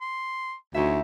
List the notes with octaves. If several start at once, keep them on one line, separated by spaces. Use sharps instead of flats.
C6
D2 D#4 F#4 C#5 E5